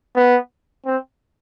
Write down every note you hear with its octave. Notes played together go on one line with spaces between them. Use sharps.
B3
C4